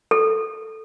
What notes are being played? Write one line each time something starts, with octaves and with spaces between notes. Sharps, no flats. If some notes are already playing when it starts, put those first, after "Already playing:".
A4